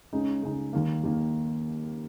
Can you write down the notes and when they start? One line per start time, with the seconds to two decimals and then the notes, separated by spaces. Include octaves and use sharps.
0.13 C#2 C#3 G#3 D#4
0.43 C#2 C#3 G#3 D#4
0.73 D#2 D#3 A#3
1.04 D#2 D#3 A#3